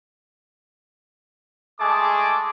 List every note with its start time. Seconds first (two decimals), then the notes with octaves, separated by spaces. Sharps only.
1.80 G#3 A3 G#4 A5 D6